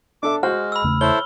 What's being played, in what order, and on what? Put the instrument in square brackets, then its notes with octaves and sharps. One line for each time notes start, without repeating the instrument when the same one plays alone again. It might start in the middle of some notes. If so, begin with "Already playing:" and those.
[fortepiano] D4 A4 E5 [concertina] D6
[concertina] G#3 [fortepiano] F#4 C5 [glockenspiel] F6
[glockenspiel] B5 E6
[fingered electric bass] E2 C#3 A3
[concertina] E4 A4 C5 [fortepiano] C#5 [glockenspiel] G7